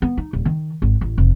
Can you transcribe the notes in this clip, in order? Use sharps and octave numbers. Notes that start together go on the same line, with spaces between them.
B3
D#4
D#1
D#3
G#1
A1
F1